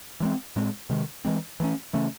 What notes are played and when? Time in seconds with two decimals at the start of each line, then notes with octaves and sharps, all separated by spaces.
0.20 E3 G#3 C4
0.56 A2 G#3 C4
0.90 C3 D#3 G#3
1.25 E3 G#3 C4
1.60 E3 A3 C#4
1.93 C#3 E3 A3 C#4